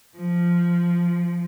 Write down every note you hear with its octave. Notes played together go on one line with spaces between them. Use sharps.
F3